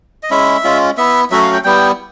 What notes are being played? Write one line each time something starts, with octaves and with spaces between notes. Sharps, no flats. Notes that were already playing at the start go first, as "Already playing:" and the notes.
D#5
G#3 C#4 E4 E5
G#3 C#4 F4
B3 E4 E5
F#3 A3 C#4 F#4 E5
F5
G5
G3 B3 E4 G5